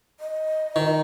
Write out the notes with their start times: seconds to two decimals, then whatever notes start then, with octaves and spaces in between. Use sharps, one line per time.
0.20 D#5
0.76 D#3